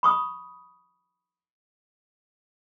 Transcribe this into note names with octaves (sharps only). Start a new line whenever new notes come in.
B5 C#6 D#6